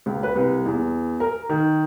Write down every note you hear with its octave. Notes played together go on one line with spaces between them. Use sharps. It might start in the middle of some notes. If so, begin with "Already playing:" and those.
C#2
B4
C2
E2
A#4
D#3